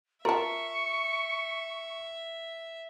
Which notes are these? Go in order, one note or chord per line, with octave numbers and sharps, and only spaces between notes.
F4 A#4 E5 A5 C#6